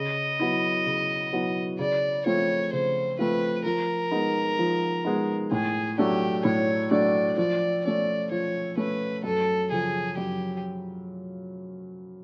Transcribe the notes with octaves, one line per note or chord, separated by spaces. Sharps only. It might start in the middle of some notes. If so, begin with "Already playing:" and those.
Already playing: C#3 D#5
F#3 B3 E4
C#3
F#3 B3 E4
C#3 D5
F3 A3 C4 F4 C#5
C#3 C5
F3 A3 C4 F4 B4
F3 A#4
G#3 B3 D#4
F3
G#3 B3 D#4
A2 G#4
F#3 A3 D4 G4
A2 C#5
F#3 A3 D4 D5
F3 D5
A3 C#4 D5
F3 C#5
A3 C#4 B4
F#2 A4
C#3 F3 G#4
F#2 G4